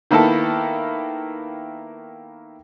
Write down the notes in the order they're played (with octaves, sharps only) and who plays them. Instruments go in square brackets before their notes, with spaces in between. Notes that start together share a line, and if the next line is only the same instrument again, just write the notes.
[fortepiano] D#3 A#3 B3 E4 A4 A5